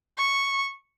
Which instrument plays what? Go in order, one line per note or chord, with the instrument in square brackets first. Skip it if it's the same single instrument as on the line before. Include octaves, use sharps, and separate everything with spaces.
[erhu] C#6